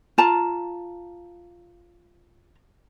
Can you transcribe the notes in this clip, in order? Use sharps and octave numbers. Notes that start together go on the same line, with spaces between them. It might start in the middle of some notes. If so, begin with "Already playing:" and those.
F4 A5 A#5